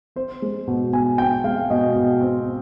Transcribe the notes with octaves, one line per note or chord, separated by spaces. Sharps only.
C4 C5
G#3
B2
B2 G#5
C4 G5
G#3 F5
B2 D#5
B2
C4